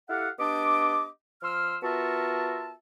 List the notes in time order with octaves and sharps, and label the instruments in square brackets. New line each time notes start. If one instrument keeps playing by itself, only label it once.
[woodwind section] E4 G4 A4 F5 F#5
B3 D4 G4 D#5 D6
F3 C6 E6 F6
B3 F4 F#4 A#4 E5 A5